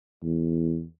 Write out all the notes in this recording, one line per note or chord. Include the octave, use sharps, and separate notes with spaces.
E2